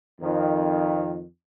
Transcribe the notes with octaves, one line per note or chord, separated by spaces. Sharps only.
F2 D#3